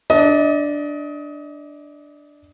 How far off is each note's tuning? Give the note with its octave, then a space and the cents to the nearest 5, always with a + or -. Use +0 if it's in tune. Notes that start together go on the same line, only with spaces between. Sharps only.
D4 +0 D#5 +30